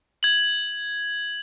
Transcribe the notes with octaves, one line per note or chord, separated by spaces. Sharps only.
G#6 F#7